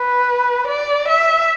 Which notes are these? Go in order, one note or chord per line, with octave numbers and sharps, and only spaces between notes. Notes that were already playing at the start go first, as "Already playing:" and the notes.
Already playing: B4
D5
E5